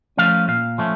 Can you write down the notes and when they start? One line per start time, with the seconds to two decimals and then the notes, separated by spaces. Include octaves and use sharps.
0.17 F3 A3 C#4 F5
0.48 A#2 F5
0.78 F3 A3 C#4